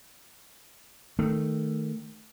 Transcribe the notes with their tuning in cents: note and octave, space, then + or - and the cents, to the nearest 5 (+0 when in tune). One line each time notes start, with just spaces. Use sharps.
D#3 +0 A3 +0